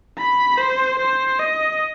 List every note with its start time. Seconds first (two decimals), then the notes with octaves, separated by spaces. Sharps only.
0.19 B5
0.58 C5
0.99 C5
1.39 D#5